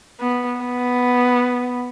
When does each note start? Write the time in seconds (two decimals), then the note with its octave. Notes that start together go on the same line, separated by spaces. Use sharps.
0.20 B3
0.60 B3